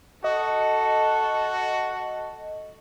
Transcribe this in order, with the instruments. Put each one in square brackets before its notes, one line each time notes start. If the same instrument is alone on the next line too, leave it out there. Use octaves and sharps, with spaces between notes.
[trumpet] F#4 [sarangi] A4 [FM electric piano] D#5